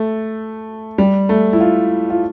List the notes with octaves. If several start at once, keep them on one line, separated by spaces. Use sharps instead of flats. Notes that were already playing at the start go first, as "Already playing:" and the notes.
Already playing: A3
G3
A3
E4
F4
F4